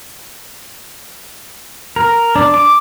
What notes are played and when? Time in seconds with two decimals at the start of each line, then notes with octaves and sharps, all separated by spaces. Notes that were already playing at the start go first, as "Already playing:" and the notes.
1.96 A#4
2.36 D4
2.54 D6